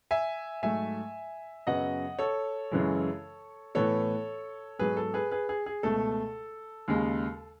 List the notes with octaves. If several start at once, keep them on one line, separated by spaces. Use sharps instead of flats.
E5 G#5
G#2 F#3 A3 E5 G#5
F#2 C#3 F#3 B3 D#5 F#5
A4 C#5
F#2 C#3 E3 G#3
A2 E3 B3 A4 C#5
G#2 F#3 B3 G#4 B4
A4
G#4 B4
G#4 B4
G#4
G#4
C#2 B2 A3 A4
D#2 C#3 G#3